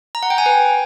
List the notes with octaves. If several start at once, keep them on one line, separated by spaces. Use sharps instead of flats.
A#5
F#5
G5
G#5
B4